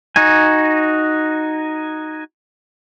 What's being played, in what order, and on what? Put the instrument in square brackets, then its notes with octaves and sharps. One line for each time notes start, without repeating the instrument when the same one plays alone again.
[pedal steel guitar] D#4 F#4 G#5